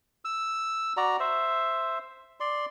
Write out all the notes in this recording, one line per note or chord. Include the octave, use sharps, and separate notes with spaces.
E6
F#4 D5 A#5
C5 E5
D5 C6